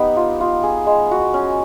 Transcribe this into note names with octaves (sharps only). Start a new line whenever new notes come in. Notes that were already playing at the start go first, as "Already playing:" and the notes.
Already playing: B3 D#4 G4
F4
F4
G#4
G#3
F#4
C#4